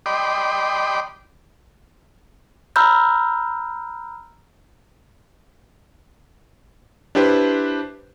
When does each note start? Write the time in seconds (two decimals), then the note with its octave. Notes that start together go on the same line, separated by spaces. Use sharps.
0.06 D5 D#5 G5 B5 C6 D6
2.76 A#5 B5 E6 F6 G6
7.15 D4 E4 G4 B4 C5